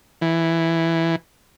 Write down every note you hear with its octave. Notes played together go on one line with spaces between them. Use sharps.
E3